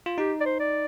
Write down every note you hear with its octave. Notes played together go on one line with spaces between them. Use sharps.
F4
D#4 G4
D5
C5
D5